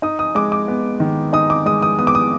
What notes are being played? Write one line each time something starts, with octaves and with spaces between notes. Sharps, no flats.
D#4 D#6
D#6
G#3 D6
D6
B3
D#3
D#4 D#6
D6
G#3 D#6
D#6
B3 D#6
D6
D#6